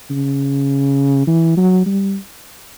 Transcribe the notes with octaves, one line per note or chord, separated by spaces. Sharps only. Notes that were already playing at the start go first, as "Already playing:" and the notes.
C#3
E3
F#3
G3